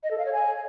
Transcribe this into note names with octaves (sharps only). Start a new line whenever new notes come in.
D#5
A4
F5
C#5
G#5